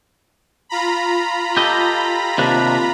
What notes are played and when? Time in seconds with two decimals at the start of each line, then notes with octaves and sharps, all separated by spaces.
0.69 F4 A#5 B5
1.57 G4 A4 D#5
2.38 D#2 C3 D4